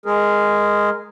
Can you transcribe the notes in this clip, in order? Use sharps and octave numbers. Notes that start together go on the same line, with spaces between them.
G#3 G#4 A#4